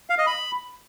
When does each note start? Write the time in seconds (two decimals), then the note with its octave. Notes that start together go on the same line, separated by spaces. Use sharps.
0.10 F5
0.18 D#5
0.27 B5